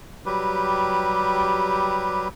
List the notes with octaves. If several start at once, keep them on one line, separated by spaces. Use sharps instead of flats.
F#3 G3 G4 B4